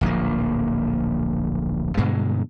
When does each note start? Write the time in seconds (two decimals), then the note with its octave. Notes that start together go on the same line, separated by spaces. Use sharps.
0.01 D1 A#1 F3 A#3
1.97 G2 B2 D3 G#3